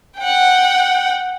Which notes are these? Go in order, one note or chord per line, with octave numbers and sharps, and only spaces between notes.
F#5 G5